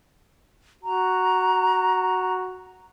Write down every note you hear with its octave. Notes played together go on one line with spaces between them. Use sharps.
F#4 A#5